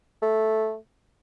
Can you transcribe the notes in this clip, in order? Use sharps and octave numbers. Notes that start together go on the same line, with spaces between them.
A3